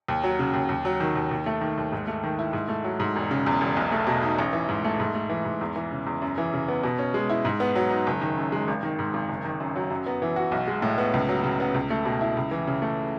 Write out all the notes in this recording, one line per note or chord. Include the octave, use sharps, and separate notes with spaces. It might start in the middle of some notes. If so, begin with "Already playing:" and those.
D#2
F#3
C#3
D#2
D#2
F#3
D#3
D#2
D#2
A3
D#3
D#2
G#2
A3
D#3
E4
G#2
A3
F#3
G#2
E1
C#3
E2
E1
B1
A3
B2
D#4
A1
E3
G#2
A3
G#2
A3
E3
G#2
E2
E3
C#3
E2
F#2
E3
C#3
B3
B2
C#4
G#3
E4
G#2
B3
F#3
D#4
F#1
D#3
F#2
G#3
G#1
D#3
G#2
G#1
F#1
D#3
F#2
F#3
F#2
B3
E3
F#4
B1
G#3
A2
B3
C#2
F#3
C#3
B3
C#2
A3
B2
E4
C#2
E3
C#3
A3